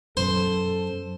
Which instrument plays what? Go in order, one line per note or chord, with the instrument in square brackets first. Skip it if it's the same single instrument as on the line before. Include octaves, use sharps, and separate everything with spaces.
[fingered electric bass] F#2 [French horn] A4 [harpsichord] C5